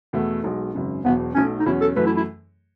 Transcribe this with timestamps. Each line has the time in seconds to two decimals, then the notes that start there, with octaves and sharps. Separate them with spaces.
0.13 E2 B2 A3 E4
0.43 B1 B2 G#3
0.74 G#1 F#2 C#3
1.05 E1 E2 B2 F#3 B3
1.35 B1 B2 F#3 A3 C#4
1.60 D#4
1.66 E2 B2 F#3 C#4 E4
1.81 A4
1.96 F#2 E3 A3 B4
2.06 E4
2.17 E4